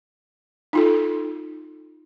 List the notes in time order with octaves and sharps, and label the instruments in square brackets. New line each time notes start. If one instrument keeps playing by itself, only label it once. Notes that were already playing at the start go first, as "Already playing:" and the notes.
[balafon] D#4 F4 A4